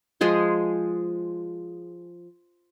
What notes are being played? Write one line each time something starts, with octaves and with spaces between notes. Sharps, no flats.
F3 G#3 G#4 C5